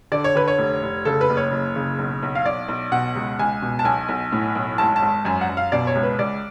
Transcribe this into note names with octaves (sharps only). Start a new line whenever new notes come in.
D3 D5
C#5
D3 B4
C#5
F1
F1
C#3 A4
B4
F#1
C#5
F#1
C#3
B1
B1
F5
B1 D5
B1
B2 F#5
C#2
C#2 G#5
B2
A5
B1 G#5
B1
A2
B1
G#1 A5
A5
G#1
F#2 G#5
F#5
F#2
F5
B2 D5
C#5
C#2
B4
C#2 D5